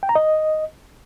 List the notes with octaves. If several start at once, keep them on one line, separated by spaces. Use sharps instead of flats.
G5
A#5
D#5